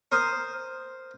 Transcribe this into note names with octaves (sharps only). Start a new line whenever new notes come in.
A#4 C5 D#6